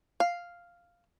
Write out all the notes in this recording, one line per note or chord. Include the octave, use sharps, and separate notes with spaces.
F5